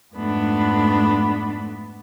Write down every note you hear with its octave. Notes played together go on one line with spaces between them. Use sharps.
F2 G#2 A3 B3 D4 B5